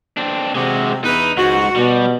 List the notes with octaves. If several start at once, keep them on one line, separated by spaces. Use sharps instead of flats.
C4 D4
C3 G#3 F#4
E2 E3 D#4 B4
C#2 G#2 F#4
B2 G3